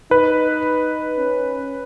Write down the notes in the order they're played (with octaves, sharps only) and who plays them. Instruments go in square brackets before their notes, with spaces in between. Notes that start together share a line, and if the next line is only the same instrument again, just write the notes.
[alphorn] D#4 [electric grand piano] B4
[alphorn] C#4